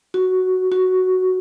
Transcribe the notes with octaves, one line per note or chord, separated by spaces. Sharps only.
F#4
F#4